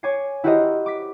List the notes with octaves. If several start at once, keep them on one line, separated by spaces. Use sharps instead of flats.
C#5 G#5 D6 G#6 C7
E4 F#4 G4 A#4 C5 D#5
D6 B6